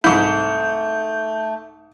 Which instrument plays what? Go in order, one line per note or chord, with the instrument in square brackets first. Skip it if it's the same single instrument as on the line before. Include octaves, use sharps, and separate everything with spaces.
[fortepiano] C2 G#2 [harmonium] A3 [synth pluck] E4 [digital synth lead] G6